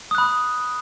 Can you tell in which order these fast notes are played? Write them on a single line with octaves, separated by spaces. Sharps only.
D#6 F#6 B5